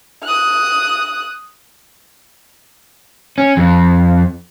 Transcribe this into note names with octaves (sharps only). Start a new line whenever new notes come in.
D#6 F#6
C#4
F2